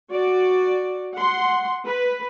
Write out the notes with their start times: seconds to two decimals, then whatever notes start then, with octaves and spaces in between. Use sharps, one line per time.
0.11 F#4 D5
1.14 F#5 C6
1.85 B4